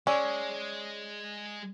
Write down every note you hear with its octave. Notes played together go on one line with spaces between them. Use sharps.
G#3 C#4 D5 D6 E6